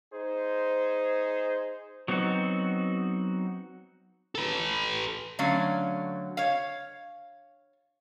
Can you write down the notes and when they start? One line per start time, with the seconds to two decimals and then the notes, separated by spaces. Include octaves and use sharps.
0.13 D#4 G#4 C5
2.08 F#3 B3 C4 D#4 F#4
4.35 A4 B4
5.39 D3 F#3 A3 C#4 F5
6.37 C#5 F5